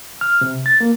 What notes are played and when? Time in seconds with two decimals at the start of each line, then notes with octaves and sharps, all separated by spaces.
0.21 F6
0.41 C3
0.66 A6
0.80 A#3